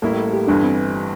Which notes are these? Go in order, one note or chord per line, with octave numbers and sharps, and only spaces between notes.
A1 A2 G3 A#3 E4 A4
A4
G4
G1 G2 E3 D4
C4